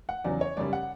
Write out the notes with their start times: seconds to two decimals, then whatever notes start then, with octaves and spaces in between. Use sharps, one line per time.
0.09 F#5
0.24 E2 C#3 F#3 D5
0.41 C#5
0.57 F#2 C#3 G3 D5
0.73 F#5